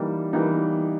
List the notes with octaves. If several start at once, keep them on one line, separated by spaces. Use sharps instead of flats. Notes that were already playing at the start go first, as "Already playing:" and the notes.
Already playing: E3 G3 A#3 D#4
E3 G3 A#3 D#4